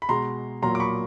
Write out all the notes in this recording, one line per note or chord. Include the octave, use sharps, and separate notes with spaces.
B5
B2 G#3 A#5 C6
A#2 F#3 A#3 A#5 C6
D6
B5 C#6